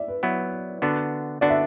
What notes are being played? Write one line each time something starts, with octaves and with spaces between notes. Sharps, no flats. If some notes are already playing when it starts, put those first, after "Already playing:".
Already playing: D5 E5
B4
F#3 B3 E4
D3 B3 D4 F#4
D3 B3 D4 F#4 D5
E5